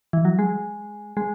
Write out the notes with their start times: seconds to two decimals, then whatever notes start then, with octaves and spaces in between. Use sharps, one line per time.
0.13 E3
0.25 F#3
0.39 G#3
1.17 G#3